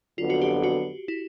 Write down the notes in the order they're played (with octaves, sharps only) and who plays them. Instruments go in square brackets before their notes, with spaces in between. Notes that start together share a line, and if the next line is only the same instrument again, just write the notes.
[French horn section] F2 D3 F#3 B3 [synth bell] F4
[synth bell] F#4
G4
F#4
E4